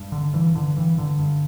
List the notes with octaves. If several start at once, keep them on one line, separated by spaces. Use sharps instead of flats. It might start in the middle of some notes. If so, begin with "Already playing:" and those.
Already playing: G2
D3
G2 E3
D3
G2 E3
D3
G2